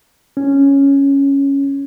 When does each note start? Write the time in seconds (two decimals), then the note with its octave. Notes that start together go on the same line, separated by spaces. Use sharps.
0.37 C#4